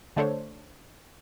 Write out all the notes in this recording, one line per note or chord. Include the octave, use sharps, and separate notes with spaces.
D3 A3 D4 A4 C5 C#5